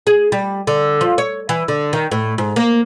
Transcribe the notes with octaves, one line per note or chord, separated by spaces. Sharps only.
G#4
G3
D3
F3
C#5
E3
D3
D#3
A2
G#2
A#3